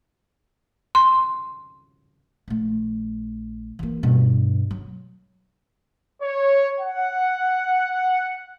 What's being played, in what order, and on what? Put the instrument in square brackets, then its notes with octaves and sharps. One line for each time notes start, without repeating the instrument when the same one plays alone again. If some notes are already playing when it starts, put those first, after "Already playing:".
[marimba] C6
[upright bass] A#1 A3
E3 A#3
G2 B2
F#3
[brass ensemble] C#5
F#5